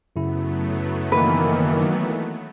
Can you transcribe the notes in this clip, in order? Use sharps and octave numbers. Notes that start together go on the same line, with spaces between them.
F#2 C#3 F#3 A3 B3 E4
D#3 E3 A#3 B4